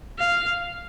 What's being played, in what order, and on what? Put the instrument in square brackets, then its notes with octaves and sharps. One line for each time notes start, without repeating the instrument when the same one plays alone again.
[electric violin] F5